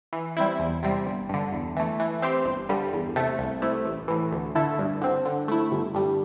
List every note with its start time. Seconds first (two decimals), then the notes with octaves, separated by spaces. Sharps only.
0.13 E3
0.37 G3 C4 E4
0.59 E2
0.83 C3 G3 C4
1.05 G1
1.29 G2 D3
1.52 E2
1.76 E3 A3
2.00 E3
2.22 C4 G4 C5
2.45 G1
2.69 G2 D3 G3
2.93 E2
3.16 C3 A3
3.38 C2
3.62 C3 A3 E4
3.85 A1
4.08 A2 E3
4.32 D2
4.55 D3 A3 E4 A4
4.78 G2
5.01 D3 C4
5.25 D3
5.48 A3 E4
5.71 G1
5.95 G2 G3